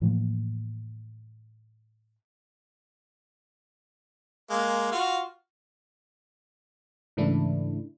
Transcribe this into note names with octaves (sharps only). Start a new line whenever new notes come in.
A2 E3 F3 A#3
G#3 A#3
F4 F#4 F5
G#2 C#3 E3 A3 D4 E4